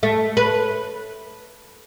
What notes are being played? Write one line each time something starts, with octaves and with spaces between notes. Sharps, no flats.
A3
B4